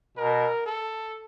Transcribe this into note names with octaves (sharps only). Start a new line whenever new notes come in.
B2 A#4
A4